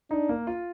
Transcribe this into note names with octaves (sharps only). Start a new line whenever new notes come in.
D4 D#4
A#3
F4